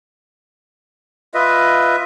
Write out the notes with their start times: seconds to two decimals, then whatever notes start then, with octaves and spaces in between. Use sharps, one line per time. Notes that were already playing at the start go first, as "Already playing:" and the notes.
1.34 F4 B4 D#5 E5